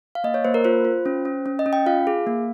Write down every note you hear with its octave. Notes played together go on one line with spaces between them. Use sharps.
F5
A#3 D#5
C#5
A#3 C5
A#4
F4 C5
F4
C#4
C#4
C#4
D#5
C#4
G5
F4 F5
G#4
A#3